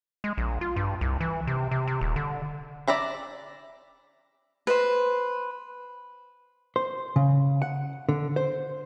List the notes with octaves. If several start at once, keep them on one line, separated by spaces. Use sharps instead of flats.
G#3
A#1
F4
G2
C2
E3
C3
C3
C3
D#1
D3
D5 E5 A#5 B5
B4 C5
C5
C#3
F#5
D3
C5